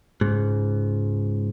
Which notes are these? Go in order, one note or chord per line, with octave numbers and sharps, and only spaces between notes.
C#2 G#2